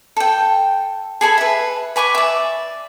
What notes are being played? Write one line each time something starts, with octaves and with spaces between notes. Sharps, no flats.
A4 G5
G#4 A4 G#5 B5
B4 E5
B4 G#5 C#6 D6
D5 E5